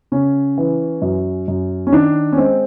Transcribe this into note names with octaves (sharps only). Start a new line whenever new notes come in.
C#3 C#4
E3
F#2
F#2
C#4
D#3 D4
C#4
G#3 C4